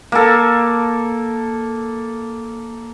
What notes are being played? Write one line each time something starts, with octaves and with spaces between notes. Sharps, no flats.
A#3 A4